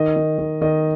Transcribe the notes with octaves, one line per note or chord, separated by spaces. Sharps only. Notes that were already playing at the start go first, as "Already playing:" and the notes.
Already playing: D#3 D#5
D#3
D#3
D#3 D#5